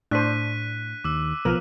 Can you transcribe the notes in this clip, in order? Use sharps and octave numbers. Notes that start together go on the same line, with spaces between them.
A2 D4 C5 F#6 B6 D#7
D#2 D6 E6
B1 F3 B3 A#4